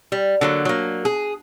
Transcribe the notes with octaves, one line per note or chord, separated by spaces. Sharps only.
G3
D3 F#3 A#3
F#3 A#3
G#4